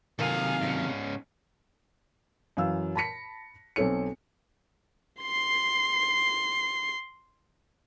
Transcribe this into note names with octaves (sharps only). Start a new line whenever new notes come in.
C3 D#3 F#3 A#3 A4 F5 G#5
G#2 C#4
F#2 E3 F5 E6
A5 B5 A#6 B6 C#7
B1 C4 A4 C#5 C#7
C6 C7